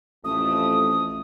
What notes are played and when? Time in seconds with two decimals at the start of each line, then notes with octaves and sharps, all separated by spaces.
0.24 A1 F2 A3 D#6